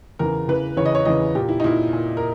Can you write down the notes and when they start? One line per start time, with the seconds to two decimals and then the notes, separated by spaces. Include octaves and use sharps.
0.19 E2 C#3 E3 A#4
0.48 E2 C#3 E3 B4
0.77 E2 C#3 E3 C#5
0.85 D#5
0.95 C#5
1.05 E2 C#3 E3 D#5
1.35 A#2 G4
1.49 E4
1.60 D#4
1.64 A#2 E4
1.93 A#2
2.17 A#4